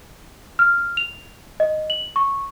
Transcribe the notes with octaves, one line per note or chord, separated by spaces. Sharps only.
F6
F7
D#5
F#7
C#6